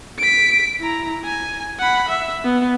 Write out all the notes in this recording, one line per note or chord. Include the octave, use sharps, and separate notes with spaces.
B6 D7
E4 A#5
G#5
F#5 B5
E5
B3